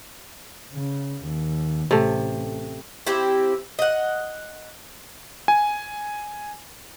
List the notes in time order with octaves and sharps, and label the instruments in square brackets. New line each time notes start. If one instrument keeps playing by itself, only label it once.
[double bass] C#3
D#2
[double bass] A1 [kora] C3 A3
[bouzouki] C4 E4 G4
D#5 F#5
[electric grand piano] G#5